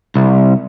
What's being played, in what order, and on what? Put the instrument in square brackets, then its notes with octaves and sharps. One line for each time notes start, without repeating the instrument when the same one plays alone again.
[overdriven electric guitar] C2